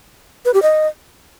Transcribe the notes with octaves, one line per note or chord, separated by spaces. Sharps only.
B4
G4
D#5